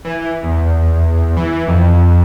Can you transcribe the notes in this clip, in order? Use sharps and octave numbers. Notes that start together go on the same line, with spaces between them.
E3
E2
E3
F2